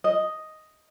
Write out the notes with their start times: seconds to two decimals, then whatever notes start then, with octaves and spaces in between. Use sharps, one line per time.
0.04 D#5